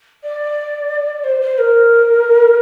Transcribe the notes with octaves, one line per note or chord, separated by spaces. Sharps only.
D5
C5
C5
A#4